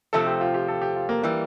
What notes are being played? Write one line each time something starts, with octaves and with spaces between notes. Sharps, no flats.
C3 F3 A3 C4 A4
G4
F4
G4
A4
G4
F4
A#3
E3 G3 A#3